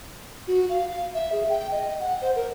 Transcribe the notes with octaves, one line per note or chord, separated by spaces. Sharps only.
F#4
F5
F5
E5
G#4
G5
D#5
F#5
C5
A#4